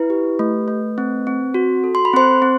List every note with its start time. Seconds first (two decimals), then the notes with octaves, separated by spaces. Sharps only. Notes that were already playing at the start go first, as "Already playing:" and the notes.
Already playing: E4 B4
0.10 G4
0.39 A3
0.68 A3
0.98 C4
1.27 C4
1.54 F#4
1.84 A4
1.95 C6
2.05 B5
2.13 C4 C5 C6
2.42 C4